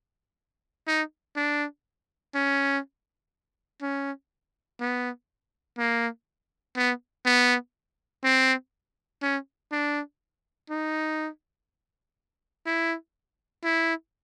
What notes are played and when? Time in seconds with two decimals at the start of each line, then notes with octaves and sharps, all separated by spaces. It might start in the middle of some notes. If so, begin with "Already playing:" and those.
0.87 D#4
1.36 D4
2.34 C#4
3.82 C#4
4.80 B3
5.78 A#3
6.77 B3
7.26 B3
8.24 C4
9.22 C#4
9.71 D4
10.70 D#4
12.66 E4
13.64 E4